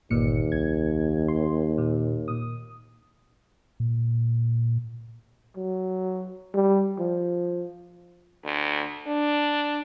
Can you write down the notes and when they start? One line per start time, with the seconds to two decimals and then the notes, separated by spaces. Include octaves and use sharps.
0.11 G1 D#2 A#2 C#7
0.52 C2 G#6
1.28 C6
1.78 A#2
2.28 A#2 D#6
3.80 A#2
5.57 F#3
6.54 G3
6.99 F3
8.45 D2
9.07 D4